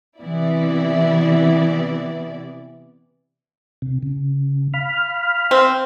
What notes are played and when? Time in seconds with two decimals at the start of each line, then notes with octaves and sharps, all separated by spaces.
0.20 C3 E3 B3 E4 D5
3.82 C3
4.03 C#3
4.74 F5 B5 F6
5.51 C4